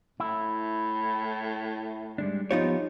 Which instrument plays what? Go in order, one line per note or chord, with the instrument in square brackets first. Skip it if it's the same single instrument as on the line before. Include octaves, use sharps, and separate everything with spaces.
[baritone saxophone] A2 [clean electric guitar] E4
[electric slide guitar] G3 G#3 D4
[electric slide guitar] F3 B3 G4 [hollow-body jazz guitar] D#4 F4 C#5